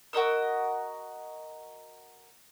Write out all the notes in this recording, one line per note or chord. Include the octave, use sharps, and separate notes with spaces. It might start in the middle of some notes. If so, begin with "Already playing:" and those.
F#4 A#4 D#5 E6